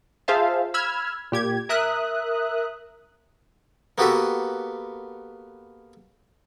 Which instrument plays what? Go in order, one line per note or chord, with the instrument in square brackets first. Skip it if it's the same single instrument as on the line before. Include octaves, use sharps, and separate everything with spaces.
[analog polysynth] F4 G#4 C5 E5 F5 A5
B5 E6 F6 G#6
A#2 G4 G#6
A#4 E5 D#6 F#6
[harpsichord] A#3 B3 F#4 G4 A4 B4